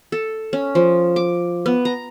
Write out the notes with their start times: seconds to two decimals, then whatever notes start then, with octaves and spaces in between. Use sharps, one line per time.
0.12 A4
0.53 C#4
0.75 F3
1.16 D6
1.66 B3
1.85 A#5